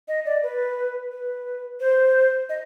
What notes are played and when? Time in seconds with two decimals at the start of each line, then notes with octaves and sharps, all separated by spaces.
0.08 D#5
0.25 D5
0.43 B4
1.12 B4
1.80 C5
2.49 D#5